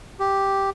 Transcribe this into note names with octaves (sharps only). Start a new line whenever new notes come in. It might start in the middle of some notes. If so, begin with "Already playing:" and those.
G4